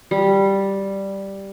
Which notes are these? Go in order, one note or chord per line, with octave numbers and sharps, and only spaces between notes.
G3